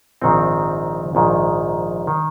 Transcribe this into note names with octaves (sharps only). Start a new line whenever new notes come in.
A#1 G#2 D#3 C4 D#4
A#1 G#2 D#3
D#3